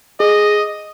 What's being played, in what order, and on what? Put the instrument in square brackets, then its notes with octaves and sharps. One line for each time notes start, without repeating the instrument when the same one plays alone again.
[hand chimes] G#4 [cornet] D#5